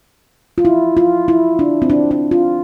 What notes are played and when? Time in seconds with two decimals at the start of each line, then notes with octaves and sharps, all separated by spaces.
0.58 F4
0.65 E4
0.97 F4
1.28 E4
1.59 D4
1.82 C4
1.90 D4
2.11 D4
2.31 F4